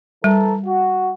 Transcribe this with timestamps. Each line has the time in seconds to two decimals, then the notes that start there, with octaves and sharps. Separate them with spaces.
0.24 E3 G3 A4 A#4
0.65 F#4